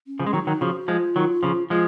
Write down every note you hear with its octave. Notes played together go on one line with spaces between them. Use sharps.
C#4
C#3 F3
G#3
D#3 F#3 D#4
D#3 F#3
C#3 F3 F#4
F3 G#3 F4
D#3 F#3
C#3 F3
F3 G#3 F4